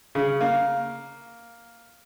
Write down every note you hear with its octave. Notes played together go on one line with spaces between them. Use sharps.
C#3
A#3